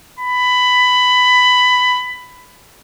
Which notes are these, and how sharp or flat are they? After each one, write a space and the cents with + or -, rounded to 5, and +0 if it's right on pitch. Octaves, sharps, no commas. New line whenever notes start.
B5 +15